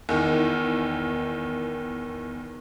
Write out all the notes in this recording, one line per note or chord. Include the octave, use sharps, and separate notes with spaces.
E2 D#3